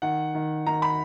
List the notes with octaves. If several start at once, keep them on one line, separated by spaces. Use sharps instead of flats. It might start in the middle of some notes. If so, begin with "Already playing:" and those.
D#3 F#5
D#3
D#3 A#5
B5